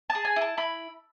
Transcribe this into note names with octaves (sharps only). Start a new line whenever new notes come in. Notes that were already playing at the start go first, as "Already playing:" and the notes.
A5
G#4
G#5
E4
A5
E4 B5